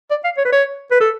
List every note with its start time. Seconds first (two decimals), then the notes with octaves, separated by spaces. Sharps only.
0.11 D5
0.24 F5
0.37 C#5
0.45 B4
0.53 C#5
0.91 B4
1.01 A4